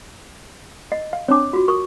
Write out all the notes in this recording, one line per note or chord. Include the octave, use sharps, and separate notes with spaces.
D#5 C7
F5
C4 D4 C#5 G#5 D6
F4 F#4
A#4 C#6 D#6